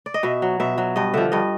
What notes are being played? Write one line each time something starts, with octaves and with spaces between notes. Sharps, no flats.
D5
D#5
B2 E5
F#3
B2 E5
F#3
G2 D#5
D3 F3 E5
G2 D#5